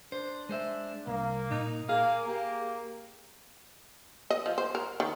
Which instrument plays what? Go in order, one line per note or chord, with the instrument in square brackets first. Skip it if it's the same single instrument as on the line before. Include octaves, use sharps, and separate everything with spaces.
[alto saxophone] D4 [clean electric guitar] C5
[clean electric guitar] G#3 C5 E5
[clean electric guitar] C2 [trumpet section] A#3
[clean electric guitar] A#2 [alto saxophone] D#4
[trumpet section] A#3 [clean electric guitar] G#4 [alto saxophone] F5
[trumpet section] A#3 [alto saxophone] G4
[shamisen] D#5
F3
C5
A#4
D#3